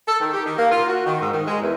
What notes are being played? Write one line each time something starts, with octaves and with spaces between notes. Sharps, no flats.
A4
D#3
G4
D#3
A#3
F4
F#4
D#3
G#2
D#3
G#3
E2